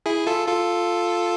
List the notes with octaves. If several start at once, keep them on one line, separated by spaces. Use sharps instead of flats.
E4 G#4
F4 A4
F4 A4